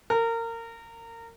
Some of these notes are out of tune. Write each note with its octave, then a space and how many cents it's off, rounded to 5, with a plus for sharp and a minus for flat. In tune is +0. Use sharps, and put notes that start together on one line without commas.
A#4 -25